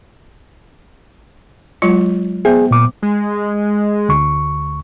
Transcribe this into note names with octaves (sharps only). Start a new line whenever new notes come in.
F#3 G#3 F4
B3 G#4 C5 E5
A#2 D6
G#3
D2 C#6